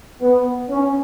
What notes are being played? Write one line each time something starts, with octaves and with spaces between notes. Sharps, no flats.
B3
C#4